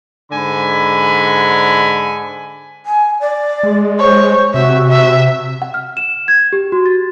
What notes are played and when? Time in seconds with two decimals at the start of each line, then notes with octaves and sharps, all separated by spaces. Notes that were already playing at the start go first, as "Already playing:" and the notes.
0.31 G#2 D3 G#5 B5
2.86 G#5
3.21 D5
3.63 G#3
3.99 C5 C#5
4.54 C3 F#4 E5
4.89 E5
5.62 F#5
5.74 F6
5.97 E7
6.28 G#6
6.53 G4
6.72 F#4
6.86 A6